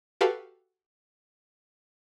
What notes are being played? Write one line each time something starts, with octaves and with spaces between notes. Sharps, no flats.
F#4 G4 A4 B4 F5